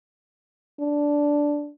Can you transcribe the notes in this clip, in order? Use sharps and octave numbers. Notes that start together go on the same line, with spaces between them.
D4